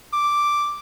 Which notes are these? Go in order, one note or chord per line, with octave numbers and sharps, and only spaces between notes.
D6